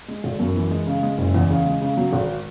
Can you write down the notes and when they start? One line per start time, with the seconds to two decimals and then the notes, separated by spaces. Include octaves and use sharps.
0.08 G#3
0.24 G#1
0.40 F#2
0.56 E3
0.71 G#3
0.87 C#3
1.03 G#3
1.18 F#1
1.34 E2
1.50 C#3
1.66 G#3
1.81 C#3
1.97 F#3
2.13 G#1